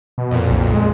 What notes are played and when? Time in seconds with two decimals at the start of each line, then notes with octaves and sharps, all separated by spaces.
0.18 B2
0.31 F2 A#2
0.50 B1
0.74 G#3